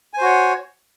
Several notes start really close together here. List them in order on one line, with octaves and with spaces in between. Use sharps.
G#5 C5 F#4 C#5